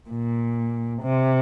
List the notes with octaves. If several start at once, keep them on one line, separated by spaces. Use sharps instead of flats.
A#2
C3